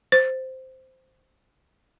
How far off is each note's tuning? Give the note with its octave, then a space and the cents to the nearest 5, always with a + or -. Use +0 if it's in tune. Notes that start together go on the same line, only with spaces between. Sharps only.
C5 -5